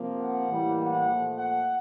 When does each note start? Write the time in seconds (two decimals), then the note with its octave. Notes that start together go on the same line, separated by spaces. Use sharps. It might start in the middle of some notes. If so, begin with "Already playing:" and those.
Already playing: C3 F3 A#3
0.20 F#5
0.49 A2 E3 G3 A#3
0.78 F#5
1.07 A#2 F3 A3
1.37 F#5